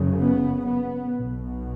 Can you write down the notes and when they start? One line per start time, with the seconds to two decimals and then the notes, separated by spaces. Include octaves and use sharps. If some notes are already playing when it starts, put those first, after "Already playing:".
Already playing: F#1 F#2 C#3
0.20 B3
0.67 B3
1.15 B1 B2